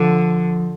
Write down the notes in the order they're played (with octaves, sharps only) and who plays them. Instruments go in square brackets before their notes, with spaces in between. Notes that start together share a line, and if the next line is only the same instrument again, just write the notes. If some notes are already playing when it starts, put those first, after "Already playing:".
Already playing: [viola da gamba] D3 [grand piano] F3